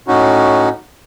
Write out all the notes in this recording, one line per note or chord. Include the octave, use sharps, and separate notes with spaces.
A2 C#4 D#4 F#4